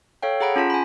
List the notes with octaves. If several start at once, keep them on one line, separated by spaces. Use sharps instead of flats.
A4 C#5 F5 G5
G#4 F#5 A#5 B5 D7
C#4 F4 A5 B6
G#5 B5